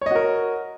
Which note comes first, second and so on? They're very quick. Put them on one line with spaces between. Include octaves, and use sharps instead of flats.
C#5 D#5 F#4 A#4